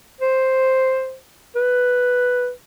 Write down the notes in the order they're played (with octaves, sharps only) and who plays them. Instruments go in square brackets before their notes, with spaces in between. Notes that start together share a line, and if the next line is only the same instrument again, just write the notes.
[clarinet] C5
B4